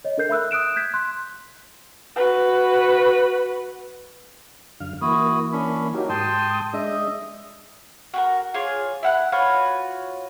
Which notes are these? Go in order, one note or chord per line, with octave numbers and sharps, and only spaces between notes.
C#5 D#5
D4 A4 A#4 G6 C7
E5 B5 E6 F#6
D#6 F#6 D7 E7
G6 G#6 B6
C6 F#6
F#4 B4
F#2 D3 F5
E3 A#3 E4 F#4 D#6
C#4 D4 B5
F#3 A#3 D#4 F#4 G4
G#2 G5 A5 C6 D#6
G#3 D4 D#5 E5 D#6
F#4 G4 A#4
F4 G#4 C#5 D6
E4 F#5 F#6
F4 F#4 B4 C#5